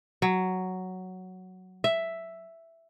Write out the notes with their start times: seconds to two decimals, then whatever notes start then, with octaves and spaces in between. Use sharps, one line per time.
0.22 F#3
1.84 E5